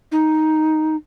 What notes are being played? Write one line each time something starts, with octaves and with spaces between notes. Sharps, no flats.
D#4